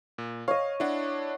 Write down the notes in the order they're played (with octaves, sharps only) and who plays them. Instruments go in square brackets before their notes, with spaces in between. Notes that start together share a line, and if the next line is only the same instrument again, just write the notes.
[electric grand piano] A#2
[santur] C#5 D#5 [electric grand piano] F5
[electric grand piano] D4 E4 [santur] F#5